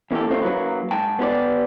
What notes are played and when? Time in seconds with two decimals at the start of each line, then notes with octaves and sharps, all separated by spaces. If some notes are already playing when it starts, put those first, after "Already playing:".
0.11 E2 A#3 F#4 G4 A4
0.29 D#3 A3 C4 F4
0.42 F#3 A#3 B4
0.91 G#2 G5 A5
1.19 B3 G4 B4 D5